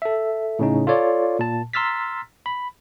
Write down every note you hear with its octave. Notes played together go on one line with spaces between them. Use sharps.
A4 E5
A2 C#3 C#4 D#4
F4 A4 C#5 D5
A#2 A5
A#5 C6 E6 F6 A6 B6
B5